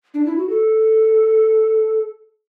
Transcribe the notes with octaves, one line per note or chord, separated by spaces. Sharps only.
D4
E4
F#4
A4